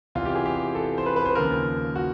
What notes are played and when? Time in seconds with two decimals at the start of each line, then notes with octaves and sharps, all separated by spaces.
0.15 E2 C3 E3 F4
0.25 G4
0.35 G#4
0.46 G4
0.75 A4
0.98 C5
1.06 B4
1.16 B4
1.25 C5
1.35 D#2 C#3 F3 A#4
1.96 F#4